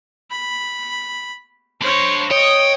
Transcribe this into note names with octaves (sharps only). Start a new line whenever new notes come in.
B5
D4 C5 C#5 B5
C#5 D#5 G5 D#6